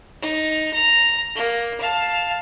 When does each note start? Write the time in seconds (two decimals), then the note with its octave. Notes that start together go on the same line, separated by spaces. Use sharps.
0.21 D#4
0.74 A#5
1.35 A#3
1.80 F5 A5